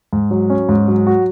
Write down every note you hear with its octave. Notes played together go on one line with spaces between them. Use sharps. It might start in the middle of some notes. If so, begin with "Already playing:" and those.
G#2
F#3
C#4
G#2
F#3
F#4